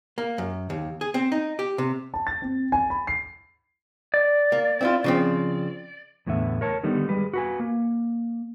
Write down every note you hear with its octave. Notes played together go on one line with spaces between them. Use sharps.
A#3
F#2
D#2
G#4
C4
D#4
G4
C3
A5
A6
C4
G#5
B5
C7
D5
A#3
C4 E4 F4
C#3 F3 C4
E2 A2 D3 B3 E5
A#4 C#5 A5
D3 D#3 G3 B3 D#4
G3 G#3 B4
F#4 B4 G#5
A#3